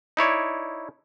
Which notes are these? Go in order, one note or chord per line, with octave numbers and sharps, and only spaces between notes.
D#4 E4 C#5 D5